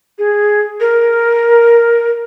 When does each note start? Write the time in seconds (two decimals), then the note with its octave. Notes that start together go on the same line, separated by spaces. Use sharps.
0.19 G#4
0.80 A#4